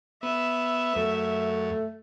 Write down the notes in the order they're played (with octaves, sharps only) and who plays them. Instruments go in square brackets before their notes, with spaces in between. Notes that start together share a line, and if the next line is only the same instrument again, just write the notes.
[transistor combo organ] B3 [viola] E5
[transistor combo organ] F#2 [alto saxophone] A3